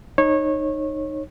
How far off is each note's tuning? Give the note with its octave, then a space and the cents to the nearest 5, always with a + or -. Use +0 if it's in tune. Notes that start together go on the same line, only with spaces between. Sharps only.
D#4 -15 C#5 -25